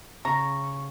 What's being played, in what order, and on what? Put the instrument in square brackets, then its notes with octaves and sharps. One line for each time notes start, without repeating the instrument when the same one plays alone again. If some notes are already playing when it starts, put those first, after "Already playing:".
[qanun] C#3 [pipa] A#5 [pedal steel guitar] C#6